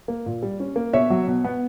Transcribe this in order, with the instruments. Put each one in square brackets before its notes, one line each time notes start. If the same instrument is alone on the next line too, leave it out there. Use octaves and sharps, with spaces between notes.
[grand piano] A#3
A#2
G3
C#4
A#3
B2 C#5 E5
F#3
B2
B3